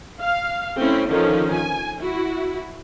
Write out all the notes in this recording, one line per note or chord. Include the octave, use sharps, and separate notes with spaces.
F5
A3 C4 C#4 E4
D3 D#3 F3 C#4 A4
G#5
E4 F#4